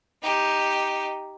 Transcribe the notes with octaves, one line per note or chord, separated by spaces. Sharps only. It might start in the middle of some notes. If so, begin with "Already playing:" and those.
D#4 G4